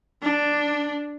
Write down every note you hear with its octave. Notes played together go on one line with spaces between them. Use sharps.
D4